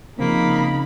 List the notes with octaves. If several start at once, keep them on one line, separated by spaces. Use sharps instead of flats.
C#3 F3 A#3 C4 D#4 B5